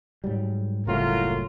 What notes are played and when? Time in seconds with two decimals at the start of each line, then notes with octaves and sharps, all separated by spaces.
0.24 G#2 F#3 G3
0.87 F#1 C2 A2 F4 F#4 A#4